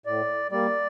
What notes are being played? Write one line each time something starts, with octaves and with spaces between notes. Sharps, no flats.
A2 D5
G3 A#3 D5